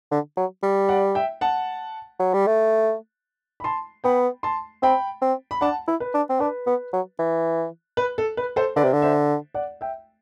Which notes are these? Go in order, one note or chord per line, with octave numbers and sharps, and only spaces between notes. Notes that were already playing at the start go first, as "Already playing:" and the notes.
D3
F#3
G3
D5 F#5
E5 G5
F#5 A5
F#3
G3
A3
B5
A5 C6
B3 G5 B5
A5 C6
C4 G5 B5
C4
B5
D4 F#5 A5
E4
B4
D4
C4
D4 B4
B3
F#3
E3
B4
A4
B4
A4 C5
D3 B4 D5
C3
D3
C5 E5
D5 F#5
E5 G5